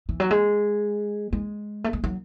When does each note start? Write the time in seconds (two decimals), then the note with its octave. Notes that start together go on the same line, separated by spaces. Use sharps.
0.09 E3
0.20 F#3
0.31 G#3
1.33 G#3
1.84 A3
1.93 G#3
2.04 F#3